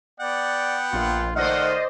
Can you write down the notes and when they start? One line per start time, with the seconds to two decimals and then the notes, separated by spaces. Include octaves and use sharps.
0.20 B3 D5 F#5 G5
0.93 A#1 F4
1.36 D#3 A3 C5 D5 D#5 F5 F#5